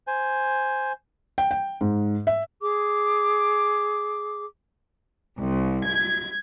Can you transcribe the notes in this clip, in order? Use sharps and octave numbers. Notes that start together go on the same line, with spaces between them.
C5 G#5
G5
G5
G#2
E5
G#4 D6
C2
G#6